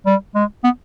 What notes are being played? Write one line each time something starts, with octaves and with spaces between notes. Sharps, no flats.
G3
G#3
B3